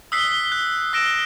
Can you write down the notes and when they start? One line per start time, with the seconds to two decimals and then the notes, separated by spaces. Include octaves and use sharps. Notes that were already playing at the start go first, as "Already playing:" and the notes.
0.12 D#6 E6 F#6 B6 C7 G7
0.52 F#6
0.93 E6 A#6 D7 E7